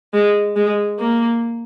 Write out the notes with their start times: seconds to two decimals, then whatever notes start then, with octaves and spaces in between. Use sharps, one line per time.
0.13 G#3
0.56 G#3
0.99 A#3